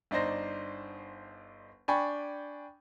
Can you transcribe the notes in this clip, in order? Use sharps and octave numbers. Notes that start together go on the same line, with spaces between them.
G1 D4 D#4 C5 A#6
D4 G5 G#5 B5 C#6